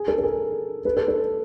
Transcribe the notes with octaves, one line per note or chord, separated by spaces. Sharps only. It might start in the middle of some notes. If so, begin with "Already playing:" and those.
Already playing: G#4
A4
A4
G#4 A#4
A4 B4
A4
A4